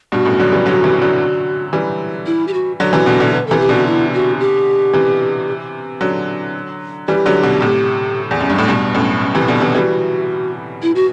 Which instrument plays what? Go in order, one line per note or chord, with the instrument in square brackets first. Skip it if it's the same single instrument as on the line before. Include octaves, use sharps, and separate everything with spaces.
[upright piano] G2 B2 [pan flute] F#4
[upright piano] F#2 A2
D3 F#3
E3 G3
D3 F#3
C3 E3
D3 F#3
E3 G3
[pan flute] E4
G4
F#4
[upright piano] D3 F#3 [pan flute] F#4
[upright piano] C3 E3
B2 D3
B2 D3
[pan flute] B4
[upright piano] C3 E3 [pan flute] A4
[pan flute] G4
[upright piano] B2 D3 [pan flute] F#4
[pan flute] E4
F#4
G4
[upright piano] C3 E3
D3 F#3
[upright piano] E3 G3 [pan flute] G4
[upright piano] D3 F#3
B2 D3
A2 C3
E2
F#2
G2
A2
G2 B2
F#2 A2
F#2
C3 E3
B2 D3
C3 E3
[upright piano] E3 G3 [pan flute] F#4
[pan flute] E4
F#4